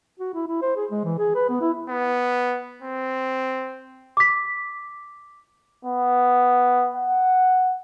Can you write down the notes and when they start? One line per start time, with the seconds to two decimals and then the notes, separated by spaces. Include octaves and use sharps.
0.19 F#4
0.34 E4
0.47 E4
0.62 C5
0.76 G#4
0.91 G#3
1.04 E3
1.18 G#4
1.35 B4
1.49 B3
1.61 E4
1.89 B3
2.82 C4
4.17 D6 B6
5.85 B3
6.96 F#5